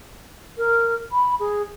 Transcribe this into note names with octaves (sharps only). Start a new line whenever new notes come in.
A#4
B5
G#4